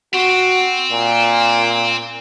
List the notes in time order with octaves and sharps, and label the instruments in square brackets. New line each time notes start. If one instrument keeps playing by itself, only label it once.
[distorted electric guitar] C4 [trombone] F#4
[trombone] A#2